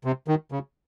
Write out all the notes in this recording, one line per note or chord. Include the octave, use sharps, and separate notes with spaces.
C3
D#3
C#3